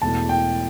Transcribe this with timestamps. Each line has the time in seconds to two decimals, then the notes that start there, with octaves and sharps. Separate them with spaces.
0.02 E1 E2 B2 A3 E4 A5
0.29 G5